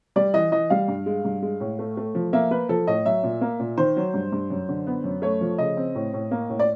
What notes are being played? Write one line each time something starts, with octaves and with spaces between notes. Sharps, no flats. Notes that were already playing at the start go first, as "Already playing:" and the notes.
G3 D5
E3 D#5
E3 D#5
G3 F5
G2
G#3
G2
G#3
A2
A3
A3
F3
A#3 E5
A#3 B4
F3 A4
A2 D#5
F#3 E5
A#2
A#3
A#2
D#3 C5
F#3
G2
G2
F#2
D3
B3
F#2
A3 C#5
F3
C#3 D#5
C4
A2
A2
A#3
A2
D5